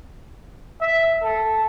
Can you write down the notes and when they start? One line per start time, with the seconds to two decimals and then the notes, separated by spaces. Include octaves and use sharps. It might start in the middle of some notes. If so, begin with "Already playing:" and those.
0.81 E5
1.23 A4